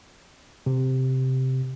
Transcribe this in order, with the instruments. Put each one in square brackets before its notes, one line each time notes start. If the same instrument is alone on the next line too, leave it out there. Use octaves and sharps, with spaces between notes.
[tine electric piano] C3